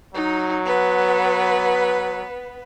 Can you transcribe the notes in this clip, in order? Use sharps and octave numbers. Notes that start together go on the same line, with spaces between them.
F#3 D#4
B3 B4